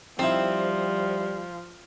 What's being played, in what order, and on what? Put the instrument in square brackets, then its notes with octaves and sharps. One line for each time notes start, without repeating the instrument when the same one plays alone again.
[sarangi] F3 [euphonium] G3 [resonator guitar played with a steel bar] C4 [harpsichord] D#4 E4